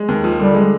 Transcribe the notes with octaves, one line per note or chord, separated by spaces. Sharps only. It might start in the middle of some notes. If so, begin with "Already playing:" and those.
Already playing: G#3
D#2
F3
D3 G3
G#3